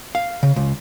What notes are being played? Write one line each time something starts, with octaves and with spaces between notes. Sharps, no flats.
F5
C#3
C#2